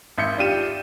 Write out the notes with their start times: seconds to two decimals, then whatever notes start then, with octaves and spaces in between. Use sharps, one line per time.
0.18 G#1 E5 G6 C#7
0.38 D4 F4 G4 D#7 E7